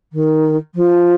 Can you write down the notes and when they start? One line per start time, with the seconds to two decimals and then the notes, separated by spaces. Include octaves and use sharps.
0.12 D#3
0.74 F3